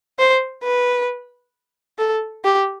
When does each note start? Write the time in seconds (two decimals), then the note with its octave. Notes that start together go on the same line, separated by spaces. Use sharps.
0.19 C5
0.64 B4
1.99 A4
2.44 G4